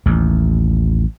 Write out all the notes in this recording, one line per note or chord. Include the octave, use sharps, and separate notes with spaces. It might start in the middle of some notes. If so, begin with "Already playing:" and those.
A1 D#2